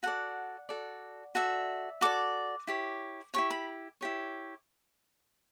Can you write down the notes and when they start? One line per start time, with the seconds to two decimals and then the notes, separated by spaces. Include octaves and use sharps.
0.03 F#4 A4 D5 F#5
0.69 F#4 A4 D5
1.35 F#4 A4 D5 E5
2.01 F#4 A4 D5 D6
2.67 E4 G4 C#5
3.34 E4 G4 C#5 C#6
3.50 B5
4.01 E4 G4 C#5